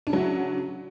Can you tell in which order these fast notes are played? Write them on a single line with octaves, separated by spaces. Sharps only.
D4 C#3 F#3 F#4 E4